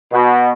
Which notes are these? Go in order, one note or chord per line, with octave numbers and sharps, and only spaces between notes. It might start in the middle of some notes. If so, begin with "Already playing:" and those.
B2